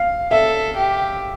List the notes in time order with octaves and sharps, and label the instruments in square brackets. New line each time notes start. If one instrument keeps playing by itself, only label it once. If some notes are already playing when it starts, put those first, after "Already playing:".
Already playing: [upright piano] F5
[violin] A4 [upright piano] E5
[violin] G4